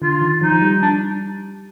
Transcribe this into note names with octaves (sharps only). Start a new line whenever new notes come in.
D3 F4
D#3
F3 D#4
F3
G3
D4